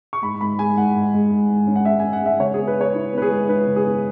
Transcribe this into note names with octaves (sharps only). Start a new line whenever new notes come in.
C#6
G#2 B5
G#2 B5
G#3 G#5
G#2 F#5
G#2
G#3
G#2
G#2
C#4
F#5
G#3 E5
C#4 G#5
F#5
G#3 E5
C#3 C#5
B3 G#4
B4
B3 C#5
E4
B3
B4
G#4
G#3
E4 B4
C#3
G#4
B3